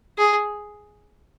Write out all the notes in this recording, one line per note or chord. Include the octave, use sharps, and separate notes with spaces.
G#4